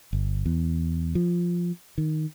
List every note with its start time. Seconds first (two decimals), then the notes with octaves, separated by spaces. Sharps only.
0.13 G1
0.46 E2
1.15 F3
1.98 D#3